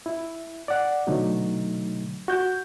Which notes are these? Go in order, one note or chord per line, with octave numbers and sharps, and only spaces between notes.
E4
D5 F#5
B2 D3 F#3 A3 D#4
F#4 G6